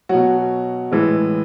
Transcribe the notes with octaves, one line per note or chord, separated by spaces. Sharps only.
B2 F#3 F#4
A2 E3 G#3